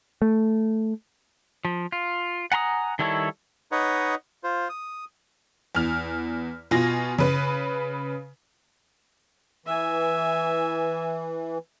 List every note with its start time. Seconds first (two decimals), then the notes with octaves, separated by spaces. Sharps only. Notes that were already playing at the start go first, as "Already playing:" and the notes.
0.22 A3
1.65 F3
1.92 F4
2.52 F#5 G#5 A#5 C6 D#6
2.99 D#3 G3 E4 A4 C#5
3.72 D#4 B4 C#5 D#5 F#5
4.44 F4 C5
4.69 D#6
5.75 E2 F6
6.71 B2 F4 G#5 A#6
7.18 C#3 B4
9.66 E3 E5 G#5